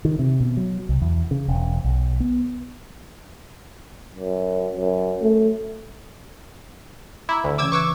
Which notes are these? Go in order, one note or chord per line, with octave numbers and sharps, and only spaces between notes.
D#3
C3
B2
F#3
C2
E2
C#3
E1
B1
B3
F#2
F#2
A3
E4 A#5 D6
D2
C#3 E3 C#4 D6 E6 G#6
B4 C#6 D6 E6 F#6 G#6